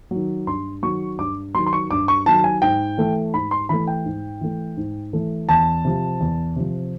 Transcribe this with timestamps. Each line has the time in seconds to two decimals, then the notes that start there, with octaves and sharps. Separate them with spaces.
0.11 D#3 F#3
0.47 G2 C6
0.83 D#3 F#3 C#6
1.19 G2 D6
1.54 F#3 C6
1.58 D#3
1.66 C6
1.73 C#6
1.91 G2 D6
2.08 C#6
2.26 D#3 F#3 A5
2.44 G#5
2.62 G#2 G5
2.98 E3 A3
3.34 G#2 B5
3.51 C6
3.69 E3 A3 B5
3.87 G5
4.05 G#2
4.41 E3 A3
4.77 G#2
5.13 E3 A3
5.48 E2 A5
5.85 C3 F3
6.21 E2
6.56 C3 F3